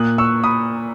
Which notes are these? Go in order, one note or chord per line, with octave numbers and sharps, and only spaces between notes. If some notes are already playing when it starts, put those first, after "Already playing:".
Already playing: A#2 D#6 F#6
C#6 E6
B5 D#6